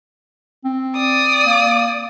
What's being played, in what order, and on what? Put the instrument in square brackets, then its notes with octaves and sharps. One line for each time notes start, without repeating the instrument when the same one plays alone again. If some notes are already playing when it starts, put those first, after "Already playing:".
[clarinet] C4
[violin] D5 D#6
[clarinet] A#3